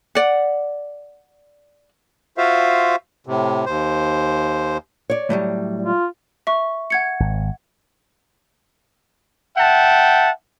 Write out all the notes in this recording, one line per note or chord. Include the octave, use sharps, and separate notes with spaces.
D5 F#5
F4 F#4 C5 E5 F5
A2 C3
D#2 C5
C#5 D5
A2 F#3 G3
F4
E5 C#6
F#5 G#6 C#7
G#1
E5 F#5 G5 A5